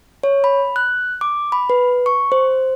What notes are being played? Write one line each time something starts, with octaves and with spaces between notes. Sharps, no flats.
C#5
B5
F#6
D6
B5
B4
C#6
C5